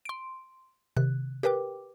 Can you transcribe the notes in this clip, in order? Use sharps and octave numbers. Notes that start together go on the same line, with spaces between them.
C6 D7
C3 D#3 F#6
G4 A#4 B4 G5 D6